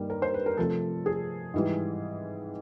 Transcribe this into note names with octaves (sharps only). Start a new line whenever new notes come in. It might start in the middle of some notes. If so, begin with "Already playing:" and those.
Already playing: G2 D#3 G3 A#3
A#4
C5
B4
A#4
C3 F3 A3 A4
G#4
G#2 E3 G3